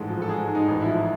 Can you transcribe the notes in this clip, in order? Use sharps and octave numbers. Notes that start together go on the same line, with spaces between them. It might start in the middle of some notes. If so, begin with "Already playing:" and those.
Already playing: A1 G#2 G#3 A4
F3
A4
G#3 G#4
G#2
D#4
A1
E4
F3